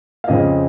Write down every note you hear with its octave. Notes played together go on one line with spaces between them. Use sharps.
F5
F2 C#3 G#3 C4 D#5